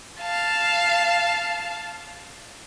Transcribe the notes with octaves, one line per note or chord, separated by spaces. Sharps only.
F5 A5